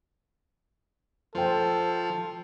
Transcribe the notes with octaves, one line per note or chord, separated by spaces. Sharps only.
F3 A4 C5 G5